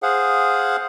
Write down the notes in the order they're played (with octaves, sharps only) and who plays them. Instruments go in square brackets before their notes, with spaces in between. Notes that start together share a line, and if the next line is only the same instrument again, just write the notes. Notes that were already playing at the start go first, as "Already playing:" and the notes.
[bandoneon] G#4 C5 F5 F#5